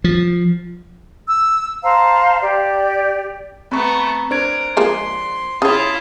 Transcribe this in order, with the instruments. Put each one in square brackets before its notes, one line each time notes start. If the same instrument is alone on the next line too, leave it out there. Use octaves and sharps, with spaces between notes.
[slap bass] F3
[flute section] E6
C5 F5 A5 A#5
G4 D5
[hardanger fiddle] A3 B3 [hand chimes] C4 A#5 [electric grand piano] B5 C#6
[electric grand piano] D4 G#6 [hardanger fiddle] A#4 [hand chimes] C5 D7
[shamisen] F3 G#3 A#3 [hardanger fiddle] C6
[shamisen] C#3 C#5 [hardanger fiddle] E4 F4 [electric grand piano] A5 D#6